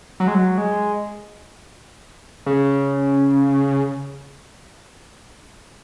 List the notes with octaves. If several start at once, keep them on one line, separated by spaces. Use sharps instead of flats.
F#3
G#3
F#3
G#3
C#3